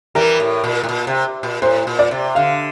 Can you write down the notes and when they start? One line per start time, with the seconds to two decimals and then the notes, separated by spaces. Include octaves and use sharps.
0.15 E3 G3 A#4
0.40 A2
0.64 A#2
0.83 A2
0.89 A#2
1.07 C3
1.43 A#2
1.62 A2 C5
1.87 A#2
1.99 D5
2.11 C3
2.35 D3 F5